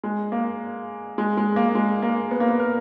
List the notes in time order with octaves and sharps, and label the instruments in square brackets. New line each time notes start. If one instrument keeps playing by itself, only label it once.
[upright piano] G#3
A#3
G#3
G#3
A#3
G#3
A#3
B3
A#3
B3
A#4